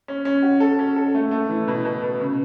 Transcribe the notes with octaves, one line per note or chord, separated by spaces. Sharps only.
C#4
C#4
F#4
A4
C#4
A4
A3
A3
E3
B2
B2
B2
C#3